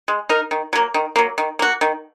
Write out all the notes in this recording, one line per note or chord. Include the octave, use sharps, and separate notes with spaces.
G#3
D#4 A#4
D#3
F#3 A#3
D#3
F#3 A#3
D#3
A#3 F#4
D#3